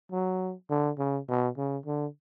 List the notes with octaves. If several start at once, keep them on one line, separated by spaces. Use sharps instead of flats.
F#3
D3
C#3
B2
C#3
D3